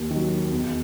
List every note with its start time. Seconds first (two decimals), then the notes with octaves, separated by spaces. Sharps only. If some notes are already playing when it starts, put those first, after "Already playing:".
Already playing: D#2
0.10 D#3 F#3
0.52 E2